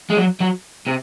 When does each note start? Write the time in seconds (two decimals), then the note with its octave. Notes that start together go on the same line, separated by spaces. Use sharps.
0.10 G#3
0.17 F#3
0.41 F#3
0.87 C3